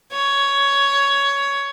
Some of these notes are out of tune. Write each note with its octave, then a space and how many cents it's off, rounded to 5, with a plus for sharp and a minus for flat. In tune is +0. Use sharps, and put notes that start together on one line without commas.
C#5 +10